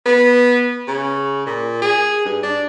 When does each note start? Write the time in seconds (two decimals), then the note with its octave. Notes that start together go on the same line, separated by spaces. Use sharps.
0.06 B3
0.88 C#3
1.46 A#2
1.82 G#4
2.25 G2
2.43 D4